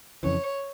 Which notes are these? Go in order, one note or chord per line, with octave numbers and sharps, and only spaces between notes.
F2 C#3 E3 C#5